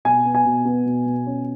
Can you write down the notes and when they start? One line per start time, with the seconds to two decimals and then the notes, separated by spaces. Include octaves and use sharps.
0.05 B2 G#5
0.26 B3
0.35 G#5
0.45 B2
0.65 B3
0.86 B2
1.06 B2
1.27 C#4